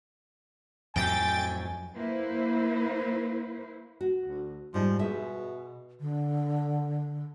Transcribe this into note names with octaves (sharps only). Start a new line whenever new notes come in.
F2 A2 F#3 G5 G#5 A6
A#3 E4 B4 C5
F#4
D2
G#2 F3 G3 D#4
B2 G#4 E5
D3